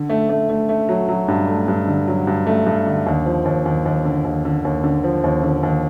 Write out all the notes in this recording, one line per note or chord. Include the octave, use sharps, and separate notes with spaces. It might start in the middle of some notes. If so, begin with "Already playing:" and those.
Already playing: D3
A3
A3
A3
A3
F#3
F#3
G2
A3
G2
D3
F#3
G2
A3
G2
D3
D#2
F3
D#2
D#2
D#2
D3
D#2
D3
D#2
D3
F3
D#2
D3
D#2